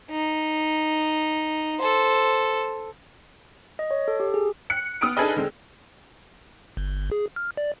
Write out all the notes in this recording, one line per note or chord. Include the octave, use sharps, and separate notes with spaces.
D#4
A4 C5
D#5
C#5
A4
G4
G#4
F#6 C#7
B3 D#6 F6 D7
D4 D#4 G#4 A4 B4 D#5
D3 G#3 C4
G1
G#4
F6
D5